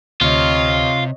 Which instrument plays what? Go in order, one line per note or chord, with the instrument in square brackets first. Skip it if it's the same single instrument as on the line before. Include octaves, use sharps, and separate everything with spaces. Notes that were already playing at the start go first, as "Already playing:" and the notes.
[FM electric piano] D2 F5 F6 [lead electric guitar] C3 [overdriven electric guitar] F4 [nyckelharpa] C#5 D#5